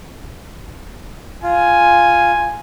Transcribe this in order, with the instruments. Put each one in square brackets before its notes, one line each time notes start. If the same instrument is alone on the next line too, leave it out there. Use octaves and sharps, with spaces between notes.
[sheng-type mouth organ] F4 [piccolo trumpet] G#5